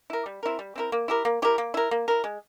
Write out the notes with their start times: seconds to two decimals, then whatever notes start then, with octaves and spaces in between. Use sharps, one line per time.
0.10 E4 A#4
0.26 G3
0.43 C4 E4 A#4
0.59 G3
0.75 C4 E4 A#4
0.92 A#3
1.08 E4 G4 A#4
1.25 A#3
1.42 E4 G4 A#4
1.58 A#3
1.74 E4 A#4
1.91 A#3
2.08 E4 A#4
2.24 G#3